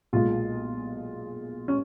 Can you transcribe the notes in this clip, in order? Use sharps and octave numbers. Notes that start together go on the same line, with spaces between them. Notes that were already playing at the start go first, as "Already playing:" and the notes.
B1 A#2 G#3 F4
C#4